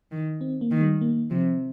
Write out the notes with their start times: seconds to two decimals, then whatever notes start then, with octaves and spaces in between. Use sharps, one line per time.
0.12 D#3
0.41 C4
0.61 A#3
0.71 D#3
0.81 G3
1.01 A#3
1.31 C3 F3